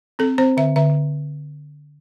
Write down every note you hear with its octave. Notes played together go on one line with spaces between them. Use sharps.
C4 A4
C4 C5
D3 E5
D3 E5